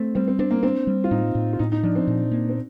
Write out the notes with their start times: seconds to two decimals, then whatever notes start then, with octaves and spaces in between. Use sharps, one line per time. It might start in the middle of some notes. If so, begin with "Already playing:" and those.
Already playing: A3 C4
0.15 G3 C4
0.28 C4
0.39 C4 D4
0.51 A#3
0.63 C4 D4
0.87 G3
1.04 F4
1.11 A2 D#4
1.35 A2
1.53 F4
1.59 A2 D#4
1.72 D#4
1.83 F3 D4
1.95 C4
2.07 A#2
2.32 A#3
2.49 C4